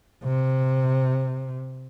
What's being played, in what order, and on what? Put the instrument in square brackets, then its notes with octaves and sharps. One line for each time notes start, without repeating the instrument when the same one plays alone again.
[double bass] C3